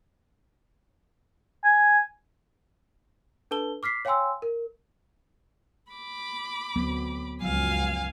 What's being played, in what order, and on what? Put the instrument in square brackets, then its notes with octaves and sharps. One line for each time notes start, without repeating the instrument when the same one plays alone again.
[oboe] G#5
[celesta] D4 A4 B4 A5 G7
D6 F6 B6 C7
C#5 F5 G5 G#5 C6 E6
A#4
[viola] B5 D6
[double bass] D2 [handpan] F#3 B3 C4
[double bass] C#2 F#2 [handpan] F3 F#3 [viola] F5 G#5